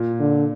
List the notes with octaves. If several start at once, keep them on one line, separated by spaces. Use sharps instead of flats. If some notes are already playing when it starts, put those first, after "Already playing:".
Already playing: A#2
D3